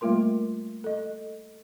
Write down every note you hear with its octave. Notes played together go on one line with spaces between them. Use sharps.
G3 A3 A#3 F4 A#4 C6
A4 D#5